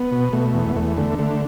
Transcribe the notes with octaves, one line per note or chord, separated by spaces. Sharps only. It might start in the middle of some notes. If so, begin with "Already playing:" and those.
Already playing: B3
B2
B2 A3
E2
B3
E2 A3
D3 A3
D3 A3